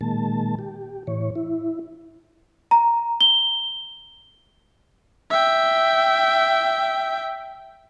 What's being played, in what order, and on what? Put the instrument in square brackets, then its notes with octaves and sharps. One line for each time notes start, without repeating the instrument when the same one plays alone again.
[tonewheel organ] A#2 D#3 G#3 A#3 A5
G4
A2 E3 C#5
E4
[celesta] A#5
G7
[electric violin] E5 G5